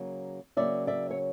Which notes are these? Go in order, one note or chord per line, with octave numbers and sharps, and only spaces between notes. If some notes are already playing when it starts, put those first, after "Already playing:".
Already playing: C#3 F#3 A#3
C#3 F#3 A#3 D5 E5
D5 E5
C#5